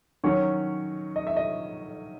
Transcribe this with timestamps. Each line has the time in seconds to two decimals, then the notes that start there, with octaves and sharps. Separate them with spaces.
0.24 D#3 F#3 C#4 C#5
1.16 D#5
1.27 E5
1.36 D#5